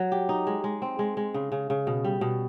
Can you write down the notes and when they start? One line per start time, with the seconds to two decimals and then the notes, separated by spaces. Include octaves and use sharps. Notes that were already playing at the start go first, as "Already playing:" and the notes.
Already playing: F#3
0.12 G4
0.29 D#4
0.47 G#3
0.64 G#3
0.82 C4
0.99 G#3
1.17 G#3
1.34 C#3
1.52 C#3
1.70 C#3
1.87 B2
2.04 G3
2.21 B2